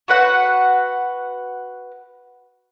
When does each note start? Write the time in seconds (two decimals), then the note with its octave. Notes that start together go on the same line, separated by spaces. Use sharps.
0.08 F#4 B4 F#5